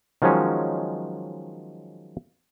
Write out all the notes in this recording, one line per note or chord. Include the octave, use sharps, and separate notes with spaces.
D#3 F3 F#3 G#3 C#4